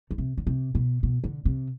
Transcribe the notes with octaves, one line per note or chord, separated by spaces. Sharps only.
D3
C3
D3
C3
B2
B2
D3
C3